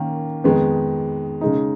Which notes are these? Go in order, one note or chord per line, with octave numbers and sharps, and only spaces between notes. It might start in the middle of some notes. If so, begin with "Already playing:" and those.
Already playing: D#3 A#3 C#4
F2 D#3 G#3 B3
C#3 G#3 D#4